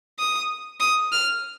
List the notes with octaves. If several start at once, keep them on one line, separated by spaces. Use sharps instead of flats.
D#6
D#6
F6